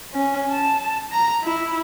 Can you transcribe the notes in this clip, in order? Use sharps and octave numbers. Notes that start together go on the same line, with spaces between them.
C#4
A5
A#5
E4